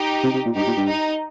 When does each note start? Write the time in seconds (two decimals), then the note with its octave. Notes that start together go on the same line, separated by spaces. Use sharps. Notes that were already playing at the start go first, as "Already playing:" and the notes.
Already playing: D#4 G4
0.24 C3
0.34 C3
0.46 A#2
0.56 G2 D#4 G4
0.67 A#2
0.77 G2
0.88 D#4